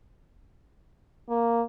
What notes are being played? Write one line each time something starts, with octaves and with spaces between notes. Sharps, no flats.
A#3